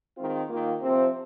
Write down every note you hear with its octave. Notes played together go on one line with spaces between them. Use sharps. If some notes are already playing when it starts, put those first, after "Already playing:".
D#3 G#3 C4 F4
D#3 A#3 F4
C3 F3 C4